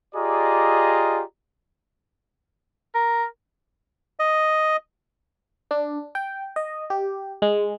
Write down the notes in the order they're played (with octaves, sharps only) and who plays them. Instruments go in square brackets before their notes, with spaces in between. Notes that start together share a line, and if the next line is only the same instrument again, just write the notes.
[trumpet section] F4 G4 G#4 D5 D#5 A#5
[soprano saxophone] A#4
[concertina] D#5
[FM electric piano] D4
G5
D#5
G4
G#3